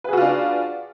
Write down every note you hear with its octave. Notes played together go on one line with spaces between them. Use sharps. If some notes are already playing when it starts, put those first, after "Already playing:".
D4 F4 F#4 G#4 B4